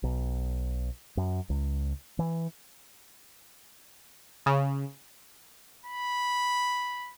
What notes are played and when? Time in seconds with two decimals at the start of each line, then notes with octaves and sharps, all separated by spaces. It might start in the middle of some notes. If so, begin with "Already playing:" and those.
0.03 B1
1.17 F#2
1.50 C#2
2.19 E3
4.46 C#3
5.86 B5